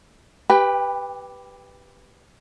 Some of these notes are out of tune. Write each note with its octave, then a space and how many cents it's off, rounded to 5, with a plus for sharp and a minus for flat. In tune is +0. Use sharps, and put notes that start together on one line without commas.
G4 +0 B4 +0 G5 +30